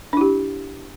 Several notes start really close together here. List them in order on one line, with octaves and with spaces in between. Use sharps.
D4 E4 G4